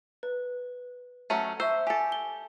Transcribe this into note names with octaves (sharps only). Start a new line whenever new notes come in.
B4
F#3 A3 C#4 D#7
C5 E5 C#6 E6
G4 A4 G#5
G7